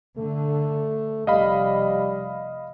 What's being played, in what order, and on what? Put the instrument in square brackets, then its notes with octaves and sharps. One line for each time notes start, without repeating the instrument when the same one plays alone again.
[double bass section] D3 [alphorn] A3
[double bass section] F1 [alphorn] G3 [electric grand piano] D#5 F5 B5